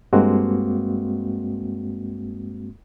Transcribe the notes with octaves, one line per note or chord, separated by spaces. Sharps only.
G2 G#3 A#3 C4 F#4